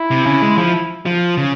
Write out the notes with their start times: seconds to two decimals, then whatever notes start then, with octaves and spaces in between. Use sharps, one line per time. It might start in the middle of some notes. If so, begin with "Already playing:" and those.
Already playing: E4
0.11 C3
0.26 C#3
0.42 G#3
0.58 F3
1.06 F3
1.37 C#3